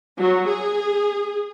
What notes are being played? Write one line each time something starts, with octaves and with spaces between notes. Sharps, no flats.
F#3
G#4